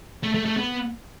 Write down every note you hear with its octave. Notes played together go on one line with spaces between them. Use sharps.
A3
A3
A3
B3